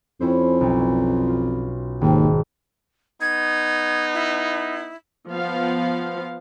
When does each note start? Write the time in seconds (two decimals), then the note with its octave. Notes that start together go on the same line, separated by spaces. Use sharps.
0.21 F2 C#4 E4 C5
0.61 B1
1.27 F4
2.01 G#1 D#2
3.21 B3 D#4 G#6
4.14 E4
5.28 F3 B3 F5